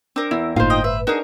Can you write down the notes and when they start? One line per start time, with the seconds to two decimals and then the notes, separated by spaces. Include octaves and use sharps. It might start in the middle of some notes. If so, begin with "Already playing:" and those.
0.16 C4 D4 A#4
0.31 E2 E4
0.56 G1 A2 A#3 D#4 F4 C5 F5
0.70 D#5 G5
0.84 B4 E5
1.07 D4 D#4 F#4 G#4 A#4 A#5